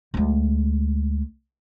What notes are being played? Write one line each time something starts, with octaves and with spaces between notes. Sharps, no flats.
D2 G#3